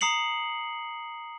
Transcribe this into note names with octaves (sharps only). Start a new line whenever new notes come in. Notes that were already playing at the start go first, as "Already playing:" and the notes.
A#5 D#6 C7 C#7 F#7